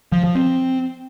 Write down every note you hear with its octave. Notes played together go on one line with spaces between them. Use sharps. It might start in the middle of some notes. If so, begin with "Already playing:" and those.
F3
F3
C4